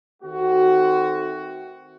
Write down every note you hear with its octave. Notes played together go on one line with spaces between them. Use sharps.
D#3 A3 C4 F#4